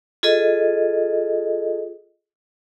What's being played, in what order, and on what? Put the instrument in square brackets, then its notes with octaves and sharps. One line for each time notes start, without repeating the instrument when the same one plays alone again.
[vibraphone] F4 G#4 A4 D#5